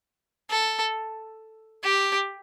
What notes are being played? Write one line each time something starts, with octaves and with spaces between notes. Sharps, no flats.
A4
G4